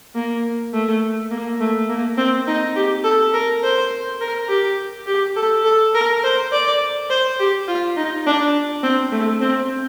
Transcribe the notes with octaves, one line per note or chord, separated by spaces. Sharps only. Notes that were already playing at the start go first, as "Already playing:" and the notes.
A#3
A3
A#3
A3
A#3
C4
D#4
G4
A4
A#4
C5
A#4
G4
G4
A4
A4
A#4
C5
D5
C5
G4
F4
D#4
D4
C4
A3
C4